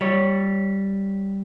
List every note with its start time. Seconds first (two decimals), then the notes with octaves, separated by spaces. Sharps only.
0.01 G3 C#5